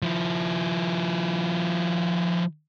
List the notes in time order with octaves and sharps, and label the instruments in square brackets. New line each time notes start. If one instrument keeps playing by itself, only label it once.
[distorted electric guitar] F3 E4